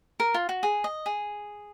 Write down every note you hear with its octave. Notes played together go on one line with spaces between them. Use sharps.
A#4
F4
F#4
G#4
D#5
G#4